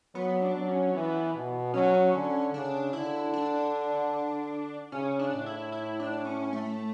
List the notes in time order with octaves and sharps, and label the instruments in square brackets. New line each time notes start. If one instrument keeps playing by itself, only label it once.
[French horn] F#3 [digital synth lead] B3
[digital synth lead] D4
[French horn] F#3
[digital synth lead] C#4
[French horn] E3 [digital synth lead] B3
[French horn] B2
[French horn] F#3 [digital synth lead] C#4
[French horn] D3
[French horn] C#3 [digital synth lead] D4
[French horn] D3 [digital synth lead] E4
[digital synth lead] D4
[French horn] C#3 [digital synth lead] C#4
[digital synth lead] D4
[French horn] A2
[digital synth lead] E4
E4
D4
C#4
A3